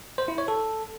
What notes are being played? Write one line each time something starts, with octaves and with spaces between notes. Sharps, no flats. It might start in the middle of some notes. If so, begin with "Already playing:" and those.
C5
E4
C#5
A4